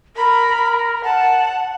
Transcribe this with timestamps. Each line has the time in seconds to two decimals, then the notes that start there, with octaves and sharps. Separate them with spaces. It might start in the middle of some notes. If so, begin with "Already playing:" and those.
0.17 A#4 B5
1.04 F#5 A5